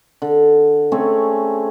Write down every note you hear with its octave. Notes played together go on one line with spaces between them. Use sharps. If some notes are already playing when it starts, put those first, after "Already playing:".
D3
A3 C4 C#4 G#4